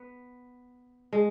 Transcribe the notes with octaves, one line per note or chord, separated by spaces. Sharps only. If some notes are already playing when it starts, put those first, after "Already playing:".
Already playing: B3
G#3